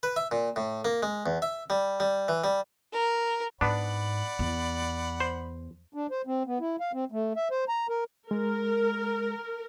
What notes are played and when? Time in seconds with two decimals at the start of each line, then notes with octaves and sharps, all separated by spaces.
0.03 B4
0.16 E5
0.31 A#2
0.56 A2
0.85 A#3
1.03 G#3
1.26 E2
1.42 E5
1.70 G3
2.00 G3
2.28 E3
2.44 G3
2.93 A#4
3.61 G#2 B3 D4 D5 F#5 B5
4.39 E2
5.20 C5
5.94 D4
6.11 C5
6.27 C4
6.47 B3
6.60 E4
6.80 F5
6.93 C4
7.12 A3
7.36 E5
7.51 C5
7.69 A#5
7.89 A#4
8.31 G#3 A#4